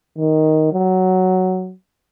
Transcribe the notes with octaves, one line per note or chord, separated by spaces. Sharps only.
D#3
F#3